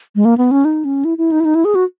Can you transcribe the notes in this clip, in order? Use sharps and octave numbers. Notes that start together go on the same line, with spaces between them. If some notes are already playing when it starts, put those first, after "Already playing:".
G#3
A#3
B3
C#4
D#4
C#4
E4
E4
D#4
E4
D#4
E4
G#4
F#4